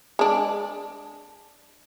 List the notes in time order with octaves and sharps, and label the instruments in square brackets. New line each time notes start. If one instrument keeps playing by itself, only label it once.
[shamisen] G#3 D4